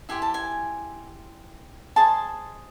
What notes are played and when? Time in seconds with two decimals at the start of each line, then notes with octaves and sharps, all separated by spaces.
0.09 E4 G4 C5 G#5
0.22 A5
0.34 G#5
1.96 G#4 C5 D#5 A5